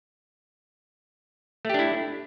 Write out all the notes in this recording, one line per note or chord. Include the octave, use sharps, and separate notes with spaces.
A3 D4 E4 G4